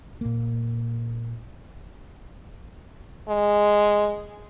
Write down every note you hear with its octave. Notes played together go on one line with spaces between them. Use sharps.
A#2 A#3
G#3